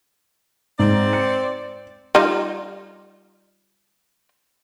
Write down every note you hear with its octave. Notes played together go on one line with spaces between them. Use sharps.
G#2 C4 D5
C#7
G3 D#4 F4